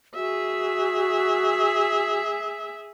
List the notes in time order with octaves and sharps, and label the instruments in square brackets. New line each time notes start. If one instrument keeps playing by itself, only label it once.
[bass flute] F#4 [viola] G#4 E5